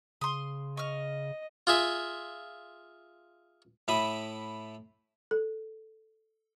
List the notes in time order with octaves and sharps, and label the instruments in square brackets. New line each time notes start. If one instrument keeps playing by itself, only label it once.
[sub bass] C#3 [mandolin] C6 D#6
[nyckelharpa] D#5 [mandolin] C#6 F6
[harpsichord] F4 G#4 E5
A2 E4 E5 B5 D#6
[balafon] A4